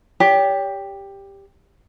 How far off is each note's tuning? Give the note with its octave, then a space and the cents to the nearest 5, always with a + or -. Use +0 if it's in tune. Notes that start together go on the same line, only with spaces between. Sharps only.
G4 +10 C#5 +45